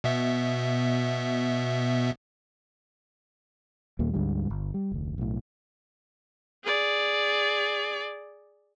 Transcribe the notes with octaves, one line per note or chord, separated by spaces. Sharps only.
B2 B3 E5
D#2 A#2 G3 A#3
D2 G#2 D3 G3
G1
G3
F1 D2
B1 A2
G#4 D5